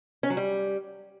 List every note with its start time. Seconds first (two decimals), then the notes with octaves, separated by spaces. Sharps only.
0.23 C#4
0.30 F#3
0.37 G3